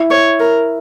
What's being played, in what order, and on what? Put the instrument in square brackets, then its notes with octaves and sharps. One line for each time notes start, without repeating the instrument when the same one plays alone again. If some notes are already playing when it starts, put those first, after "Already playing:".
Already playing: [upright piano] E4
[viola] C#5
A#4